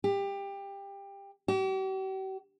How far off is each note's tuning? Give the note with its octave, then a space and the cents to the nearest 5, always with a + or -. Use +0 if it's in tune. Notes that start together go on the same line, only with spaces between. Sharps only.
G4 +20
G4 -45